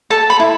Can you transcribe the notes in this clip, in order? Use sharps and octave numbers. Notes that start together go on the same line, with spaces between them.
A4 A5
B5
E4